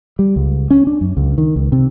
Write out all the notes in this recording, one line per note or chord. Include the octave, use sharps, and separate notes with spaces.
G3
C#2
C#4
D4
F#2
C#2
D#3
C#2
C3